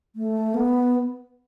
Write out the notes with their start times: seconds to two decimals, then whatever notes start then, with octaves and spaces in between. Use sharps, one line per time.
0.16 A3
0.54 B3